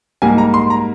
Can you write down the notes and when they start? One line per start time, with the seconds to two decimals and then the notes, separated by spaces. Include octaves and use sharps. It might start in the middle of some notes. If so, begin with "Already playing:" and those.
0.22 G#2 G3 A#3 G#5
0.38 A#5
0.54 C6
0.70 A#5